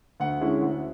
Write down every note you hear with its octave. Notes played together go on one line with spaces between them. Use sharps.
D2 F#5
D3 G#3 C#4 E4
D2